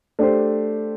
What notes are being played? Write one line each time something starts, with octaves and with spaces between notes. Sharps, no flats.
A3 D4 G4 C5